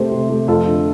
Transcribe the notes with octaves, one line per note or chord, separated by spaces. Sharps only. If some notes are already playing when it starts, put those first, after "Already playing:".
Already playing: C3 A3 G4 C5
C3
A3
F2 F4 A4
D3